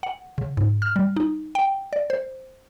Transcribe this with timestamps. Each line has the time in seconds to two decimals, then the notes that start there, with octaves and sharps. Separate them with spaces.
0.03 F#5
0.38 C#3
0.57 G#2
0.82 F6
0.96 G3
1.16 D#4
1.55 G5
1.93 D5
2.10 C5